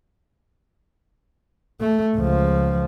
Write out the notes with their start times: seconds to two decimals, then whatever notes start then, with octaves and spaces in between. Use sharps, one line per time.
1.80 A3
2.16 C#2 F3